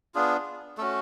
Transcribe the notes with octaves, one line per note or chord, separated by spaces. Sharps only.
B3 D4 F4 G#4
A3 C#4 F#4 A4